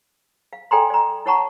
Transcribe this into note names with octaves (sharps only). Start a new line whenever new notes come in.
F5
A4 D5 G5 G#5 A#5 C6
D5 A#5
E4 C#5 F#5 A5 A#5 C#6